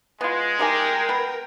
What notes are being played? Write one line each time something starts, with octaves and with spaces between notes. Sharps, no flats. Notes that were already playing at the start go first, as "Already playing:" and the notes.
G#3 B3 F4
D#4 G4 A#4 G5 G#5
B3